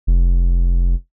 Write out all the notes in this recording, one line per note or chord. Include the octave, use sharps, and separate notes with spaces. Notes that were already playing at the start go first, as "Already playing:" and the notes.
F1